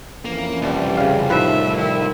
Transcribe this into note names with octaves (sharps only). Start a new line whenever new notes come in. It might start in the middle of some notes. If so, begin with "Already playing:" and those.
F2 E3 A#3 C#4
C2 G3
C#3 F5
A2 D#3 F3 A3 D#4 B4 E5
D#3 E4